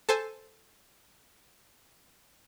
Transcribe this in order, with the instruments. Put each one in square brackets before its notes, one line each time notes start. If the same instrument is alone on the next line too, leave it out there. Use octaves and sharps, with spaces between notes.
[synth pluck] A4 C5 G#5